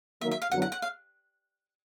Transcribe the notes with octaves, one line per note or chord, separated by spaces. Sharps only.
D#3 F#3 A#3 E5
E5
F5
F#2 D3 F#3 B3 E4 F#5
F#5
F#5
F5